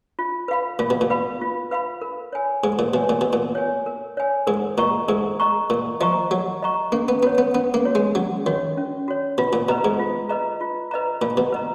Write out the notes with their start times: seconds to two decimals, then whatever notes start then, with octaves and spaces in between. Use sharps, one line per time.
0.19 F4
0.48 B4 F5 B5
0.79 A#2 F4
0.90 B2
1.01 A#2
1.10 B4 F5 B5
1.41 F4
1.71 B4 F5 B5
2.02 A#4
2.33 C#5 G#5
2.64 G#2 A#4
2.79 A#2
2.94 B2 C#5 G#5
3.09 A#2
3.21 B2 A#4
3.33 A#2
3.55 C#5 G#5
3.86 A#4
4.17 C#5 G#5
4.47 G#2 A#4
4.78 A#2 D#5 A#5 C#6
5.08 G#2 A#4
5.40 D#5 A#5 C#6
5.70 A#2 A#4
6.00 F3 D#5 A#5 C#6
6.31 F#3 A#4
6.63 D#5 A#5 C#6
6.92 A#3 C#4
7.08 B3
7.23 B3 F#4 C#5
7.38 B3
7.55 B3 C#4
7.74 A#3
7.85 F#4 C#5
7.95 G#3
8.15 F#3 C#4
8.46 D#3 F#4 C#5
8.77 C#4
9.08 F#4 C#5
9.38 B2 F4
9.53 A#2
9.69 B2 B4 D#5 A#5
9.85 G#2
9.99 F4
10.29 B4 D#5 A#5
10.61 F4
10.91 B4 D#5 A#5
11.22 A#2 F4
11.37 B2
11.52 B4 D#5 A#5